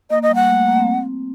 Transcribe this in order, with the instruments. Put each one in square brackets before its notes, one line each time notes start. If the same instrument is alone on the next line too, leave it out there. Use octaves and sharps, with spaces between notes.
[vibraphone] A#3 [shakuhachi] D#5
[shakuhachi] D#5
[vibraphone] G3
[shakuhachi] F#5
[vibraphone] A3
A#3
C4
C4